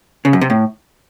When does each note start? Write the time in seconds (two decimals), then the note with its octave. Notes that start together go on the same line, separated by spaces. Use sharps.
0.25 C#3
0.33 F#2
0.41 C3
0.50 A2